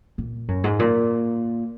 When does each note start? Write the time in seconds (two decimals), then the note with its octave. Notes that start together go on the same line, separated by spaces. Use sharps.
0.18 A#2
0.48 F#2
0.64 G#2
0.79 A#2